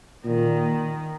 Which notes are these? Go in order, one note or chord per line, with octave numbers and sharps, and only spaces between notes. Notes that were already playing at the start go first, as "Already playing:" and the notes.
A#2 D#3